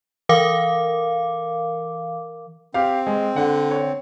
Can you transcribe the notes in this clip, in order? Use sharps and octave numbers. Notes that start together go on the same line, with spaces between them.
E3 A#4 F5 D6
C4 G4 F5
G#3
D3 F#5
C#5